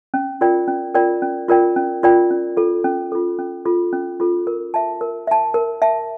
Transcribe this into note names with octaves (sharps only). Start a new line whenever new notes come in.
C#4
F4 A#4 D5 G5
C#4
F4 A#4 D5 G5
C#4
F4 A#4 D5 G5
C#4
F4 A#4 D5 G5
C#4
F4 A4
C#4
F4 A4
C#4
F4 A4
C#4
F4 A4
A#4
E5 A5
A#4
E5 A5
A#4
E5 A5